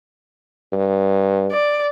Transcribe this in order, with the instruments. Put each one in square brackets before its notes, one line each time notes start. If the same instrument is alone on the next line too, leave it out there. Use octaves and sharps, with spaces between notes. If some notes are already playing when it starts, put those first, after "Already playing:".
[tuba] G2
[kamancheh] D5